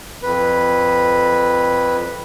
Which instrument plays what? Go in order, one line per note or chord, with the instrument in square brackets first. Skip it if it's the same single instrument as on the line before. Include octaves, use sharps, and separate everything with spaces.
[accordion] F2 B4